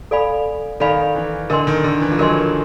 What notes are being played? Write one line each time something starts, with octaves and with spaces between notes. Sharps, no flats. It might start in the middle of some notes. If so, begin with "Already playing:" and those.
A4 D5 F5 G#5 B5
D#3 A4 D5 F5 G#5 B5
E3
D3 A#4 D#5 G#5 C6
D#3
D3
E3
F3
F#3 A#4 D#5 G#5 C6